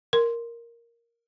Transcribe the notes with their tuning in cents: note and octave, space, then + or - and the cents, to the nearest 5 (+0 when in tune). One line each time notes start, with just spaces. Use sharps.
A#4 +0 C6 +0